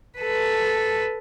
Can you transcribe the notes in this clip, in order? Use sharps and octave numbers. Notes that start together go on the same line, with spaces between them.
A4 B4